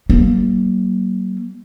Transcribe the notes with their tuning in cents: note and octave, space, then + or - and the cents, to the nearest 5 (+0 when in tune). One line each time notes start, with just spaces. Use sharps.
F#3 +40 A#3 +15